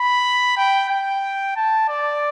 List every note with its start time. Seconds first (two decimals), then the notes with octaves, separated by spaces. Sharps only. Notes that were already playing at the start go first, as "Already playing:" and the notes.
Already playing: B5
0.57 G5
0.90 G5
1.56 A5
1.89 D5